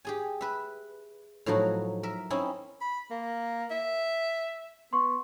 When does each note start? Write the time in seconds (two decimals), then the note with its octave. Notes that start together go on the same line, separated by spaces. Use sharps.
0.05 G4 G#4 G#5
0.41 B4 E5
1.46 A2 F3 F#3 D#4 F#4
2.03 A#4 E5
2.30 C4 C#4 D#4 E4
2.81 B5
3.11 A#3
3.71 E5
4.93 B3 C6 C#6